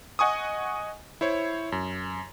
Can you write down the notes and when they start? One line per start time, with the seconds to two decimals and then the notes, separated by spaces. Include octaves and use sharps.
0.19 D#5 F#5 G#5 C#6 D#6
1.21 E4 C5 C#5
1.72 F#2